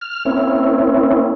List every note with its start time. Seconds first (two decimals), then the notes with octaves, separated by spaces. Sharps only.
0.01 F6
0.25 A#3 C4 C#4 E4